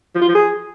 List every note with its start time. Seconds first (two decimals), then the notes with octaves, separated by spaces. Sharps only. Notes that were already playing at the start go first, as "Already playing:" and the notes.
0.15 F3
0.22 F4
0.28 F3
0.35 G#4